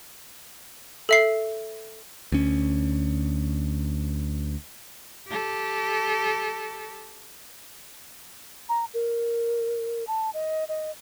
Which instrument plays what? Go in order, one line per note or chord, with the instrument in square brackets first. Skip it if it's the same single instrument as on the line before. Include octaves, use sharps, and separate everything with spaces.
[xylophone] A4 E5 C7
[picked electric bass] D2 C#4
[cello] G4 A4
[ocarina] A#5
A#4
A5
D#5
D#5